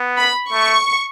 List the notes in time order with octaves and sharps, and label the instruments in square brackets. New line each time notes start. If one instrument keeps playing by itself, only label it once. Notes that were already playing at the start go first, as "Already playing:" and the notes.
Already playing: [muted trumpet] B3
[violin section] B5
[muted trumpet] A3 [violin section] C#6